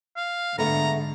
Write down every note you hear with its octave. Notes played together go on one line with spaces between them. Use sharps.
F5
G#2 D3 A3 B3 A#5